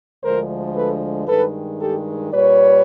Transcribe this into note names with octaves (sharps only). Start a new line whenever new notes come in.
D2 D3 F3 G#3 A#4 C5
A4 B4
G2 D#3 G#3 A4 B4
G4 A4
A#2 G3 B4 C#5